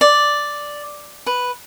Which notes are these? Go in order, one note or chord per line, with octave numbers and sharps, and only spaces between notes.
D5
B4